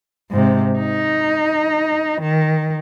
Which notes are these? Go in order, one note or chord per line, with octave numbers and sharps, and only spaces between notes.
G#2 C3
D#4
D#3